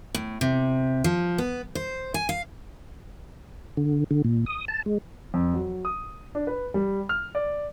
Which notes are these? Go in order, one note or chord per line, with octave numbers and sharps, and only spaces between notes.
A2
C3
F3
B3
C5
G#5
F5
D3
D3
A#2
D#6
A5
G#3
F2
F#3
D#6
D4
B4
G3
F6
D5